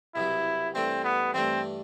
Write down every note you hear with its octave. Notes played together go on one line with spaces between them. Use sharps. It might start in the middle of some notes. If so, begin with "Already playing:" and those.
C2 B2 F#3 E4
G2 E3 A3 C4 D4
B3
G2 E3 A3 C4 D4